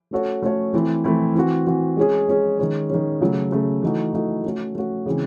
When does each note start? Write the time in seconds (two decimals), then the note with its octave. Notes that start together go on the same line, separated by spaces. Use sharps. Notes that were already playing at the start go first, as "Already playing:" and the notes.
0.11 A3 C#4 F#4 A4 C#5
0.42 A3 C#4 F#4 A4 C#5
0.73 E3 A3 C4 E4
1.04 E3 A3 C4 E4
1.35 E3 C4 F#4
1.67 E3 C4 F#4
1.97 G#3 C#4 G#4
2.28 G#3 C#4 G#4
2.59 D#3 G#3 C#4
2.90 D#3 G#3 C#4
3.21 C#3 F#3 A3
3.52 C#3 F#3 A3
3.82 E3 A3 D#4 F#4 A4
4.13 E3 A3 D#4 F#4 A4
4.44 A3 C#4 F#4
4.75 A3 C#4 F#4
5.06 C#3 E3 G#3 C4